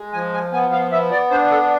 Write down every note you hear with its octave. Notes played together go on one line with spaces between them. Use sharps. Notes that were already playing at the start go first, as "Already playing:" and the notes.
Already playing: G#3
F3 G#5
G#5
B3 G#5
F5
B3 E5
D5
D4 C5
A4